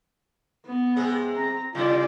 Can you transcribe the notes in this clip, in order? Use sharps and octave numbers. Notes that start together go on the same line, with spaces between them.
B3
C3 G#3 G#4
C4 A#5
C3 G3 E4 F4 D5